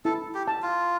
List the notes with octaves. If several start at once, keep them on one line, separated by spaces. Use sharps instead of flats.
E4 A4
G4
A5
F4